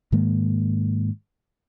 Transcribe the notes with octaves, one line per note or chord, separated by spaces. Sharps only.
G#2 D#3 G#3 A#3